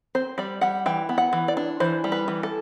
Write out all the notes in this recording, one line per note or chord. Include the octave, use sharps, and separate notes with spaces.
C4 C5
G3 D5
G3 F#5
E3 G5
B3
F#5
E3
D5
D4
E3 C5
G3
B4
E3
A4